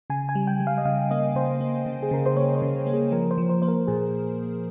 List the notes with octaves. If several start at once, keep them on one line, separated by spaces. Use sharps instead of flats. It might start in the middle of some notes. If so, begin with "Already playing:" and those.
C#3 G#5
G#5
G3
G5
G3
F5
D#5
C#3 F5
A#3 D#5
C#3 C5
A#3
C#3
G#4
C#3 A#4
C5
A#3 C#5
C5
C#3
A#3
G#4
F3 A#4
C5
F3
C5
A#3 C5
A#4
A#2 G#4